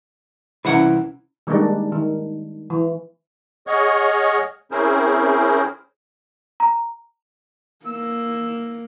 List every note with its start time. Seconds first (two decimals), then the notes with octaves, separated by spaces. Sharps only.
0.65 C2 E3 C#4 E4 F#5
1.47 D#3 G3 G#3 A#3 D4 D#4
1.92 D#3
2.70 E3
3.67 G#4 C#5 D#5 F#5 C#6 F6
4.71 C4 C#4 E4 G#4 A#4 C5
6.60 A#5
7.86 A#3 E6